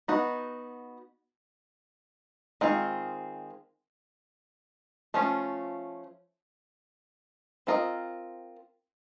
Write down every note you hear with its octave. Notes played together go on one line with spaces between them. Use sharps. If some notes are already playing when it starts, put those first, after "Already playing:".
B3 D#4 F#4
D#3 G#3 C4 F4
F3 A3 C#4 F4
C4 F4 A#4 D#5